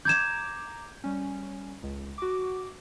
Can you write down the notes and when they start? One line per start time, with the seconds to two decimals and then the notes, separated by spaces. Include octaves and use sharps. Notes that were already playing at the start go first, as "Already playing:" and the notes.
0.05 A#5 D6 G6 G#6 E7
1.04 G3 C#4
1.83 C#2
2.18 F#4 D6